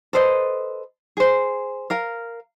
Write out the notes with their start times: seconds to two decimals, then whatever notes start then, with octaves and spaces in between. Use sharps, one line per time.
0.13 A4 B4 C5 D#5
1.17 G#4 C5
1.90 A#4 F5